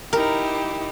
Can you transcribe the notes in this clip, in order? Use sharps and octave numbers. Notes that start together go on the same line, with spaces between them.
D#4 E4 G4 A#4